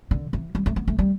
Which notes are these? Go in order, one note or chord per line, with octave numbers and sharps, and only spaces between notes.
D3
E3
G3
A3
B3
A3
G3